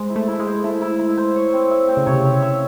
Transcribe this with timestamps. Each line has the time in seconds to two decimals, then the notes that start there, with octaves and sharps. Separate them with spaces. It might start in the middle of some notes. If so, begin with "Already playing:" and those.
Already playing: G#3 C5
0.10 E4
0.16 A3
0.28 E4
0.40 G#3
0.47 C5
0.64 A3 E4
0.82 E4
0.99 E4
1.17 C5
1.36 C#5
1.53 C4
1.71 E5
1.88 C4
1.97 C#3
2.06 C3 C#5
2.24 E5
2.42 E5